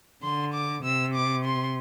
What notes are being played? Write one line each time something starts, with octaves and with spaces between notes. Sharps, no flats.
D3 C6
D6
C3 E6
D6
C6